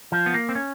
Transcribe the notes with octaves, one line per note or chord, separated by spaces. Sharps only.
F3
B3
A#3
C4
C#4